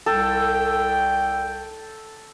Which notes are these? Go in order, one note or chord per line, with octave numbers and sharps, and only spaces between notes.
C2 A4 G5